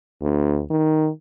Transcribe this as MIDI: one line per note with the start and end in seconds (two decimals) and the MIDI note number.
0.21 0.63 38
0.70 1.09 51